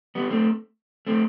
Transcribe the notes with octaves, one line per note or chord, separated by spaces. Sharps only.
G3 B3
A3 C4
A3 C4